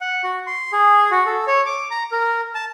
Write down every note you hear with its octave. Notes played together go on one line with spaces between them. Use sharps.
F#5
F#4
C6
G#4
F#4
A4
C#5
D6
A#5
A#4
A5